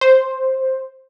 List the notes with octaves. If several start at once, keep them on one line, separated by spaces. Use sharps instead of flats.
C5